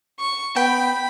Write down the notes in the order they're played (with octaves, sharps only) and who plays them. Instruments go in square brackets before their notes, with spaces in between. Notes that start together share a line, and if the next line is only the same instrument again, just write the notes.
[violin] C#6
[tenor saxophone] B3 [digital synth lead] G5 [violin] B5